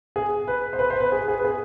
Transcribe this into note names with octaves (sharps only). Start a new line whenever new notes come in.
G#4
B4
C5
B4
C5
B4
G#4
G#4
B4
G#4